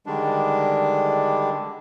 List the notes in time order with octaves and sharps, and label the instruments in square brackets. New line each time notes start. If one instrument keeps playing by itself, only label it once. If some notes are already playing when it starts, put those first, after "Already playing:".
[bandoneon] D3 D#3 G3 G#3 D4